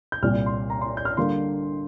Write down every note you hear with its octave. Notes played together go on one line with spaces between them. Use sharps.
G6
C2 A#2 G3 F6
C6
A#5
C6
G6
F6
D3 G3 A#3 C6